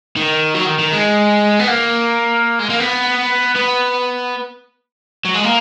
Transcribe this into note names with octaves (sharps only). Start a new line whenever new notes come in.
D#3
F#3
D#3
D#3
G#3
B3
A#3
G#3
A#3
B3
B3
F#3
G#3
A#3